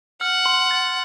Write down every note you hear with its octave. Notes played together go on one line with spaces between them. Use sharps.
F#5 F6
C6
A6